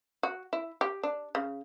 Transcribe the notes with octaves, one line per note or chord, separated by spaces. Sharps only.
F#4
E4
G4
D4
C#3